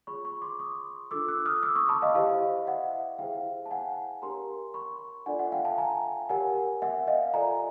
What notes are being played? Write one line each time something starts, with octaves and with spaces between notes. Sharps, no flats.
F4 G#4 C#5 B5 C#6
B5 C#6
C6 D6
C#6 D#6
D4 F4 A4 D6 E6
E6 F#6
D#6 F6
D6 E6
C#6 D#6
A5 B5
D#5 F5
E4 G4 C5 D#5 F5
E5 F#5
E4 G#4 C5 F5 G5
A5
F#5 G#5
D4 G4 A#4 C#5 A#5 C6
B5 C#6
D4 F4 A4 D5 F#5 G#5
E5 F#5
F5 G5
G5 A5
G#5 A#5
G4 A#4 C#5 F#5 G#5
E5 F#5
D#5 F5
F4 A4 D5 G#5 A#5